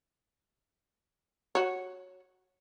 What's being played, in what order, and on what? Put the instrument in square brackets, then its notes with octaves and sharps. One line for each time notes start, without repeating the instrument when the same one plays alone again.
[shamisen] F#4 C#5